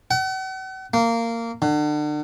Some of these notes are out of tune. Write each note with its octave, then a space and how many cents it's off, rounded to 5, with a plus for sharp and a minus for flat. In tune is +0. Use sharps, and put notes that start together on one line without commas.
F#5 +40
A#3 -15
D3 +35